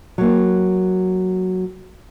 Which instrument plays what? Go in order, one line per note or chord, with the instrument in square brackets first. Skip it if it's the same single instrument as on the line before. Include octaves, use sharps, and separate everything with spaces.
[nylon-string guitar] F#3 A#3